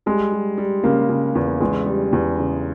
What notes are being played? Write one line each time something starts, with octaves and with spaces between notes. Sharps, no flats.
G3 G#3
G3
G3
C#3 A#3
C#3
E2
E2 G#3
G3
E2
C#3